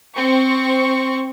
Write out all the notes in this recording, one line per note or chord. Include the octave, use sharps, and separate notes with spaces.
C4 C#6